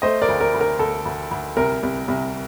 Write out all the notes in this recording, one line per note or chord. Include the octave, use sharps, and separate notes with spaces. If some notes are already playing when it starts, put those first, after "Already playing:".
A3 C5 D#5
A#4 D5
D2
A#4
D2
A#4
D2 A4
D2
D2
C2 A#4
C2
C2